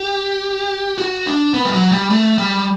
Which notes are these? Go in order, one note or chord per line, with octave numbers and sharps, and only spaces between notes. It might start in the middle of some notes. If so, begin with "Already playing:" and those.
Already playing: G4
F#4
D4
B3
G3
F#3
G3
A3
G3